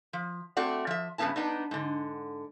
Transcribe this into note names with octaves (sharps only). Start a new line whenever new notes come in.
F3
A3 C4 F#4 D5 F#5
F3 E5
G2 C#3 F3 B3 E4 A5
B3 D4 D#4
G#2 D3